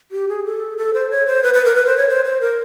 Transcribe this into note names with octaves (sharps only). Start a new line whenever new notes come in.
G4
G#4
A4
A4
C5
C#5
C5
B4
B4
A#4
B4
C5
C#5
C5
C5
A#4